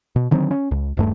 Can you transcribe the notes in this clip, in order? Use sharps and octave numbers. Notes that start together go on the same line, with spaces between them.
B2
D3 D#3 F#3 C4
C#4
C#2
D#1 G2 A3